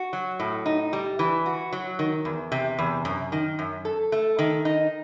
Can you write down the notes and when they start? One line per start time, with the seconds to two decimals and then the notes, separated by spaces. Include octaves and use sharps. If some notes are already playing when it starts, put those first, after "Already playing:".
Already playing: F#4
0.13 F#3
0.39 A2
0.66 D#4
0.93 G3
1.19 E3
1.46 F#4
1.73 F#3
1.99 D#3
2.25 E2
2.52 C3
2.78 E2
3.05 F#2
3.32 D#3
3.59 F#2
3.85 A4
4.12 A3
4.39 D#3
4.65 D#4